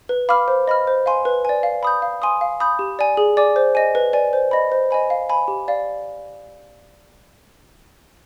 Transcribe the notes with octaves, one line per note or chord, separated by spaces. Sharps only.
B4
F5 B5 D6 F6
C5
D#5 B5 F6
C5
F5 G#5 C6
B4
D5 G#5
F5
B5 D#6 G6
F5
G#5 C6 D#6
F5
B5 D#6 G6
G4
D5 G#5
G#4
D5 G#5 D6
C5
D#5 G#5
B4
D5 G#5
C5
D#5 B5
C5
D#5 G#5 B5
F5
G#5 B5
G4
D5 F5